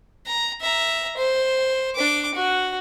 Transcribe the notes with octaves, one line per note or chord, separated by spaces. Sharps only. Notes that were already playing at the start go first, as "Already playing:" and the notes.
A#5
E5 A#5
C5
D4 D6
F#4